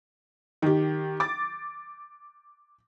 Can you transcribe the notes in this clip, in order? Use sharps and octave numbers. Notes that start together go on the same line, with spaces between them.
D#3 G4
D6 A6